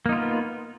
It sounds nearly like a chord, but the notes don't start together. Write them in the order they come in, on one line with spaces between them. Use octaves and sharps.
A#3 D#4 F4 B3